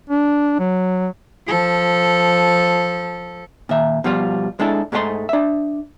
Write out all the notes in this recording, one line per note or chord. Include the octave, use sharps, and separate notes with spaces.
D4
F#3
F3 A4
A#2 D#3 E5
B2 F3 G3 F4
G#3 D4 E4 A4
G#2 G#3 A3 F#4 D#5 C6
D4 E5